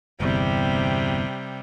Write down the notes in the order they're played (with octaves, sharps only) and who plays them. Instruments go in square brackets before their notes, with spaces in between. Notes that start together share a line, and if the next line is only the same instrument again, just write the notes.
[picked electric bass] G1 E2 [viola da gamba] C3 G3